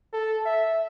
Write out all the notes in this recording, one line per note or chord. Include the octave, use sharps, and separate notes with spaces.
A4
E5